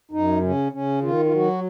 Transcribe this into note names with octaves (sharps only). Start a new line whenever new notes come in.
F#2 D#4
C#3 C#4
C#3 C#4
D#3 F4
F4
F#3 F#4